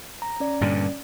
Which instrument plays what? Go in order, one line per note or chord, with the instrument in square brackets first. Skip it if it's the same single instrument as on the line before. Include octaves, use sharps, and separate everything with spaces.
[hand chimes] A#5
C#4 D5
[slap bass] G2 A#2 D3